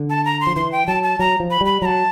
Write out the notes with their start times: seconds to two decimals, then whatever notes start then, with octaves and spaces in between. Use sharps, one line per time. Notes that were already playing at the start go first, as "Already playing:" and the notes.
Already playing: D3
0.10 A5
0.25 A#5
0.41 C6
0.47 F3
0.56 E3 C6
0.72 G5
0.87 F#3 A5
1.03 A5
1.19 F#3 A#5
1.40 F3
1.51 B5
1.61 G3 B5
1.82 F#3 A5 A#5